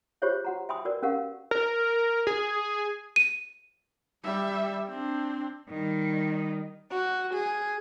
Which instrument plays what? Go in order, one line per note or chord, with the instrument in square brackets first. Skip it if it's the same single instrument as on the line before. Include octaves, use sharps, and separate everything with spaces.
[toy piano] F4 G4 G#4 C5 C#5 E5
F#4 F#5 A#5
E5 G5 G#5 B5 C6 D#6
F#4 A#4 B4 D5
C#4 G4 A#4 F5 F#5
[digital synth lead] A#4
G#4
[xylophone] D#7
[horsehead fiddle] G3 E5
C4 D4
[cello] D#3 G3
[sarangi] F#4
G#4